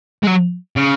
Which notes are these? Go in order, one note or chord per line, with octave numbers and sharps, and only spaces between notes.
G#3
F#3
C#3